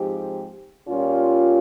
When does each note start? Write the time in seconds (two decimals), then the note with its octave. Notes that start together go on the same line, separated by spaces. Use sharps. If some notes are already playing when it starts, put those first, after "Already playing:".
Already playing: G#2 F3 C4 G4
0.88 A#2 G3 C#4 F4